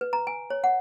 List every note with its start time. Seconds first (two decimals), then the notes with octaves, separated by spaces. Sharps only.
0.01 B4
0.13 A#5
0.27 G#5
0.50 C#5
0.64 F#5